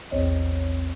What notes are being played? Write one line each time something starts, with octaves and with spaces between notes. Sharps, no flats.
A#1 E2 C4 C#5 D#5